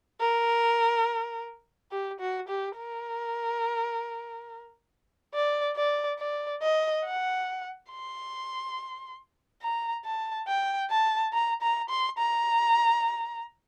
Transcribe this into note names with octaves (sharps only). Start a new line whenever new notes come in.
A#4
G4
F#4
G4
A#4
D5
D5
D5
D#5
F#5
C6
A#5
A5
G5
A5
A#5
A#5
C6
A#5